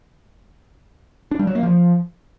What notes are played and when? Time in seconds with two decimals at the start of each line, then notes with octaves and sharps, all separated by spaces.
1.31 D4
1.39 G3
1.47 F#3
1.55 A#3
1.63 F3